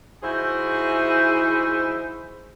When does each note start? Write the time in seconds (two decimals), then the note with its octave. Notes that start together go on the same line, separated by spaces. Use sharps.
0.23 E3 D#4 E4 F#4 G#4 C5